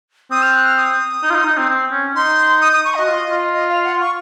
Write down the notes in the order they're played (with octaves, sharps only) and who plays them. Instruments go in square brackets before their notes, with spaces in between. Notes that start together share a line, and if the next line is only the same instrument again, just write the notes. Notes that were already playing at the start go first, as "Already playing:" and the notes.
[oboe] C4 [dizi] D#6
[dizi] F6
F#6
F6
D#6
[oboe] D#4
F4
D#4
D#4
C4
C4
C#4
[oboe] D#4 [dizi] C6
[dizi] D#6
D#6
C#6
[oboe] F#4 [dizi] D#5
[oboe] F4
F4
[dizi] D#5
F5
F#5
C#6